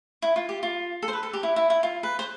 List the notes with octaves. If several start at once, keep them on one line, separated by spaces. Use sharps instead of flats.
E4
F4
G4
F4
A4
C5
B4
A4
G4
E4
E4
E4
F4
B4
C5